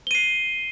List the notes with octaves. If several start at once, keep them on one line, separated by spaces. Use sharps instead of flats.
C7 D#7 G7